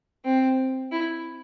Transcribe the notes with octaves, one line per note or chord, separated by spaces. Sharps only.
C4
E4